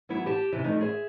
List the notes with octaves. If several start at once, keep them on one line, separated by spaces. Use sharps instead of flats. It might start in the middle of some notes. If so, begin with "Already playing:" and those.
E3 F#3 B3 E4
G4 A5
C3 E3
E2 F3 G3 A3 D#4
G#4 C5 E5